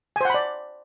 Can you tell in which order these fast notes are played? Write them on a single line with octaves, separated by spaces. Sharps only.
G#5 C5 F#5 B5 D5